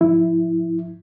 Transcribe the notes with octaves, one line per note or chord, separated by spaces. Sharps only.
G#2 F3 E4